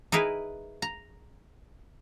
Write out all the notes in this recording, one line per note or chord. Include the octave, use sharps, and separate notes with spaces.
D#4 E4 G#4 A#4 B4
A#5